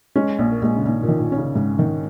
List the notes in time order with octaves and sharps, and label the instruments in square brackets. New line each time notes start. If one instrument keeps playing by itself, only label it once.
[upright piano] G#3 [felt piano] C#4
[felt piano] A#1
[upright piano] A#3
[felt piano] A#1 [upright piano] G#3
[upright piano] C#3
[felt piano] A#1 [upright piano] D#3
[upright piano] A#2
[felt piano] D#3
[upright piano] A#2
[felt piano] C#4
[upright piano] C#3
[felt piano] G#2
D#3